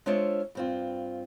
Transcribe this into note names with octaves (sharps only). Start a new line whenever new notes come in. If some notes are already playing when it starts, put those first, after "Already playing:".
G#3 D4 F4 C5 C#5 E5
G2 C4 F4